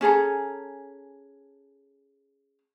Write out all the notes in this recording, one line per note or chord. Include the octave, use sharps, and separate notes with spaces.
C#4 G#4 A4 A#5